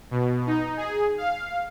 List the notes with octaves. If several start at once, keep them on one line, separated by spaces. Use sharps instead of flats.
B2
D#4
G#4
F5